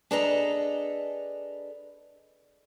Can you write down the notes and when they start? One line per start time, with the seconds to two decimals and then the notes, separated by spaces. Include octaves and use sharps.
0.11 D4 G#4 A4 B4 D#5 A#5